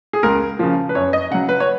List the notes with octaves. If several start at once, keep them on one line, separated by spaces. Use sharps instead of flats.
G#4
C#2 A#4
C#3 F3
B4
F#2 C#5
D#5
C#3 F#3 F#5
B4
C#5